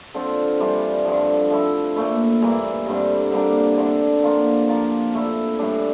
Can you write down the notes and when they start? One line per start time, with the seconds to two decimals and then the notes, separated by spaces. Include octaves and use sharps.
0.14 D3 F3 C4 F4
0.60 E3 G3 D4 F4
1.05 G2 D3 F3
1.51 F3 A3 E4
1.96 A#2 A3 E4
2.41 G2 E3 A#3 E4
2.87 G2 D3 G3 C4
3.32 D3 G3 A#3 D4
3.77 D3 A3 D4
4.23 F3 A#3 F4
4.69 F3 A#3 F4
5.14 A#2 A3 E4
5.59 A2 E3 G3 D4